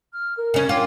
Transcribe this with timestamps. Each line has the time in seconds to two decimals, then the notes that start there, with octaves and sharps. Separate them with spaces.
0.11 F6
0.37 A#4
0.54 C#3 C#4
0.69 F4 C#5 G5 D6